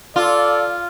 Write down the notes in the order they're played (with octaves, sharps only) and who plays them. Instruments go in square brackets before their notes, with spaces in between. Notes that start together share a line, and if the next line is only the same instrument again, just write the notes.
[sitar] F4 [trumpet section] A4 D5